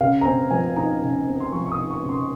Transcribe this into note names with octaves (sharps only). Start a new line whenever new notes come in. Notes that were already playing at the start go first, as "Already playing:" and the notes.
C#3 F5
A#5
C4 G#5
F3 G#5
D#4 A#5
C#3
C4
C6
F3 C#6
C#6
D#6
D#4
C#6
C#3
C6